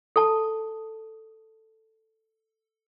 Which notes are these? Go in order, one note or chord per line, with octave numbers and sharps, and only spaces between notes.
A4 A5